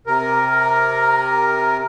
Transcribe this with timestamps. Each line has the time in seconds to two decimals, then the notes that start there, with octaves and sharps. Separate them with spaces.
0.07 C3 A#4